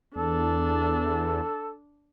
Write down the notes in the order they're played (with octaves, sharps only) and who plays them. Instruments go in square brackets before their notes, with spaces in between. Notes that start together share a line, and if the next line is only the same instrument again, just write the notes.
[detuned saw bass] E2 [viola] D4 [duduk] A4